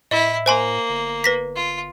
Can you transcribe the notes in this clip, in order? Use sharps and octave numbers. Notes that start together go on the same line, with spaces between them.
A2 E4 D#5
A#3 C5 G#5 C6
G1
B4 A#6 B6
F4